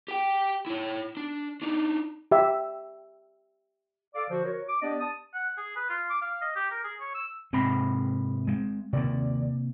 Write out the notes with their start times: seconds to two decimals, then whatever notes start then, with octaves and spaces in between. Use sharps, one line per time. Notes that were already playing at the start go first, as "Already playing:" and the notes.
0.08 G4 G5
0.67 E4 C#5
1.17 D4
1.62 D4 D#4
2.31 G4 E5
4.15 A4 D5 F5 D6
4.30 D3 F3 F#4 C5
4.45 F#4 A#4 C#5
4.68 D6
4.82 B3 D4 G4 D5 D#5
5.01 A5 D#6
5.34 F#5
5.58 G#4
5.76 B4
5.89 F4
6.10 D6
6.22 F5
6.41 D#5
6.56 G4
6.71 A#4
6.84 G#4
7.00 C#5
7.15 E6
7.53 G#2 C3 C4 B5
8.47 G#3 C4
8.93 D#2 C3 A#3 C4 D5